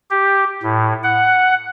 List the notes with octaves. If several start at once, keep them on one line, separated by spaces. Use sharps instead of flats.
G4
A2
F#5